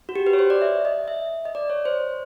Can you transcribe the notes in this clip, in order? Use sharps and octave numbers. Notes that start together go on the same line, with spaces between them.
F#4
G4
B4
C#5
C5
D5
E5
D#5
E5
D#5
D5
C#5
C5